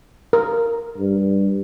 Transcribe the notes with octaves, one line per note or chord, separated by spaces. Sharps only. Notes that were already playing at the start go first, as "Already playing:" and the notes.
A#4
G2